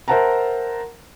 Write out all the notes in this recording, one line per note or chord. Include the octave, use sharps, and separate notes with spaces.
A#4 C5 E5 F#5 A5 A#5